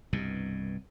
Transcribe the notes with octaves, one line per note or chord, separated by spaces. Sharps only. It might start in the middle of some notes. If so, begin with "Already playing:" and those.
C2 G2 B2